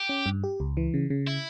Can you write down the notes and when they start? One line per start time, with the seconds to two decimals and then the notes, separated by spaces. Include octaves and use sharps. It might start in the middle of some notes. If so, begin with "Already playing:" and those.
Already playing: G4
0.09 C#4
0.26 G2
0.44 G4
0.60 C#2
0.77 E3
0.94 C#3
1.10 C#3
1.28 E4